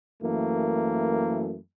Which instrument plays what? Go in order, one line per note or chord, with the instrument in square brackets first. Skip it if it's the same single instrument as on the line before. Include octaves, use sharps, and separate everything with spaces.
[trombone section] F#2 E3 A3 A#3